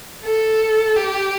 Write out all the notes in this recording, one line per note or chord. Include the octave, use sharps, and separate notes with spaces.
A4
G4